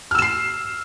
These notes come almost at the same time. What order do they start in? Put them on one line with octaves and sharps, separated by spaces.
F6 E6 E7 C7